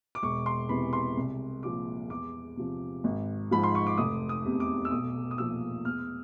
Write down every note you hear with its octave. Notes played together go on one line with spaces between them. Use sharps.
D6
E1 C#6
C6
E2 C3 E3 B5
C6
C2
A#2 F3 D6
E2 D6
C3 F3
G#1
G#2 F3 B5
C6
C#6
D6
F1 D#6
D#6
E2 C3
D6
E6
B1 D#6
D#6
A#2 F3 E6
E2 F6